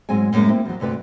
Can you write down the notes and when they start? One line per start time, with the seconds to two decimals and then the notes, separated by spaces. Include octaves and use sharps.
0.09 G#2 F#3 G#3 C4 G#4 G#5
0.32 F#2 A2 D#3 G#3 A#3
0.48 A#3 C4 E4
0.65 E2 F#3
0.80 D2 G2 C3 B4 D5